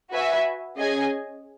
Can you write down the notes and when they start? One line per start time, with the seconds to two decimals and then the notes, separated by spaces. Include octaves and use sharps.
0.12 F#4 B4 E5 G#5
0.78 C#4 G#4 D#5 G#5